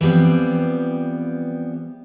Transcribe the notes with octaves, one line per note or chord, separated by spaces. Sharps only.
E3 F3 G3 B3 C4